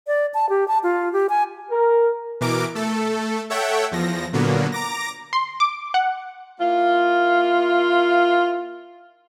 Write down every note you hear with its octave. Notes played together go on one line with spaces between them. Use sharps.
D5
A5
G4
A5
F4
G4
G#5
A#4
B2 E3 A#4 D6 D7
A3 A4
A4 C#5 E5 F#5 G5
E2 F3 A#6
A#2 D3 F#3 A#3 B3
A#5 D6 A#6
C6
D6
F#5
A#3 E4 F4